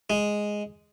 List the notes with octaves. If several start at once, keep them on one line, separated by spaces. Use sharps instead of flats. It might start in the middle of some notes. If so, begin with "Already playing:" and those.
G#3